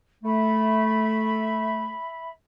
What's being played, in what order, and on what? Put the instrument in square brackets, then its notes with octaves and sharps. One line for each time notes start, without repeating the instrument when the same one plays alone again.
[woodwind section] A3 [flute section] E5 B5